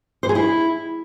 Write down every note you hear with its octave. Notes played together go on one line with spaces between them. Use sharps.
C5
G#4
E4